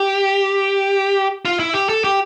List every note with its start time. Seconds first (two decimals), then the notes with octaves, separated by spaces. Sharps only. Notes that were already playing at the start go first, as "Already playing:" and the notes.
Already playing: G4
1.45 F4
1.60 E4
1.74 G4
1.89 A4
2.04 G4